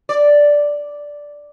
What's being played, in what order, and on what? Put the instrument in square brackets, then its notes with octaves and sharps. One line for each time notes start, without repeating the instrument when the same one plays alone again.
[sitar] D5